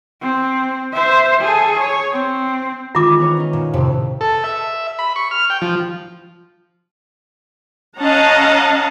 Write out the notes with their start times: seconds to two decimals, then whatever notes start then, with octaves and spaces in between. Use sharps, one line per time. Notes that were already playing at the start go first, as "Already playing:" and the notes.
0.21 C4
0.93 C5 E5
1.42 G#4 A4
1.79 C#5
2.12 C4
2.95 D#3 G#3 E4 F4 D6
3.18 B3 A#4 C#5
3.37 C#4 D#4
3.53 A#2
3.73 F2 A2 C3
4.21 A4
4.44 E5
4.99 B5
5.16 C#6
5.31 F6
5.50 G5
5.62 F3
7.99 C#4 D#5 F5 F#5 A5 A#5